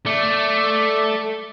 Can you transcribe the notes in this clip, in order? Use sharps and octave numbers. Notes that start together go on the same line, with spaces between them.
A3 D5